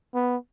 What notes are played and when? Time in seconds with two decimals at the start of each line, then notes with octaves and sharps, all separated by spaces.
0.14 B3